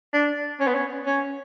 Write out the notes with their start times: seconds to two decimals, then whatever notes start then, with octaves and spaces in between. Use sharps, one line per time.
0.13 D4
0.60 C#4
0.67 B3
0.74 C#4
1.06 C#4